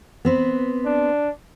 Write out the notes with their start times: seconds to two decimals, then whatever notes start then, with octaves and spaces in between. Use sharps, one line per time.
0.25 B3 C4 B4
0.85 D4